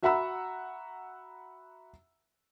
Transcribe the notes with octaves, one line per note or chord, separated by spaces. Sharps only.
F#4 E5 F#5 A#5 B5 E6